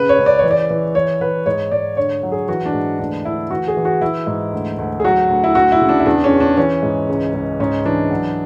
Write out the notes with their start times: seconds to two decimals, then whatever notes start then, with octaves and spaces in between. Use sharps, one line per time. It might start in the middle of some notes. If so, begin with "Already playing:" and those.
Already playing: C#3 B4
0.09 C#5
0.18 C#2
0.26 D5
0.39 E3 C#5
0.51 D5
0.70 E3
0.95 E3 C#5
1.21 E3 B4
1.46 G#2 C#5
1.71 G#2 D5
1.97 D3 C#5
2.23 F#3
2.32 G#4
2.48 E3 F#4
2.65 D4
2.74 G#2
2.99 D2 D4
3.25 D2 E4
3.51 E3 F#4
3.68 G#4
3.77 E3
3.85 F#4
4.01 E3 E4
4.27 G#2
4.52 D2
4.78 D2
5.00 G#4
5.04 F#3 F#4
5.29 D2
5.44 E4
5.55 D2 F#4
5.72 E4
5.81 C#3
5.89 D4
6.00 E4
6.06 E2 D4
6.24 C#4
6.32 E2
6.40 D4
6.57 E3 C#4
6.83 G#2
7.09 C#2
7.34 C#2
7.60 G#2 C#4
7.85 E3 D4
8.11 F#3